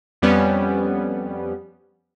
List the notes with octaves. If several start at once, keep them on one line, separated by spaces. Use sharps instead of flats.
F2 G3 B3 C#4